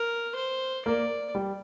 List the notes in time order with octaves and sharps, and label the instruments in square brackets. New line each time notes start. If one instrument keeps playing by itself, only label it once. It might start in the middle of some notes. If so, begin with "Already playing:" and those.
Already playing: [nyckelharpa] A#4
C5
[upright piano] A#3 [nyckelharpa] D5
[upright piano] G3